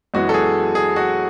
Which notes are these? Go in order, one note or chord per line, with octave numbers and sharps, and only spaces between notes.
F#2 E3 G#3 B3 F#4
A4
G#4
G#4
F#4